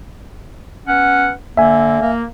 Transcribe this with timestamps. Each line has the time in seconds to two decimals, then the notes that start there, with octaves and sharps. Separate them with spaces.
0.88 B3 C#4 F#5
1.57 D3 A#3 E5 G#5
2.01 A#3